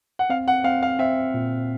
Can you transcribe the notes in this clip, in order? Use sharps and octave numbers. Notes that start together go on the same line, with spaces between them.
F#5
C4 F5
F#5
C4 F5
F5
C4 E5
A#2